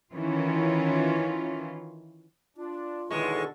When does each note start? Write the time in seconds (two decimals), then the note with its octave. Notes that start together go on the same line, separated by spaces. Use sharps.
0.14 D#3 E3 C#4 F4
2.57 D4 F4
3.11 D#2 B2 D3 E3 G#3 A4 C#6